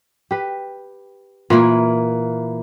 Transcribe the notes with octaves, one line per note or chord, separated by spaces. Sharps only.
G4 B4
A#2 E3 A#3